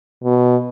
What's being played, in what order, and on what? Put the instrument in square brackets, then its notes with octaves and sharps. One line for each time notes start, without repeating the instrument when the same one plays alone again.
[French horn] B2